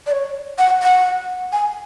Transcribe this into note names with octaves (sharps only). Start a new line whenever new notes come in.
D5
C#5
F#5
F#5
G#5